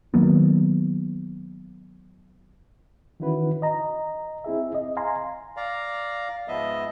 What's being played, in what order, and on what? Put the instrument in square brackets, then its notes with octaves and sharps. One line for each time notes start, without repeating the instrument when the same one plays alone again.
[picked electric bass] D#3 F#3 A#3 B3
[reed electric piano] D#3 E3 C#4 E4 F#4 B4
D#5 A#5
C4 E4 G#4 E5
D#5
F5 G#5 A#5 C6
[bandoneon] D5 F5 A#5
G#2 F3 B3 D#5 E5